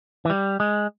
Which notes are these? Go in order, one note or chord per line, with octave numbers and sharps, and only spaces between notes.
E3
G3
G#3